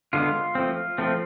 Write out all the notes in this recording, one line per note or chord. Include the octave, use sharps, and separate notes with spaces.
D3 G#3 B3 F4
F3 A3 C4
F3 A3 C4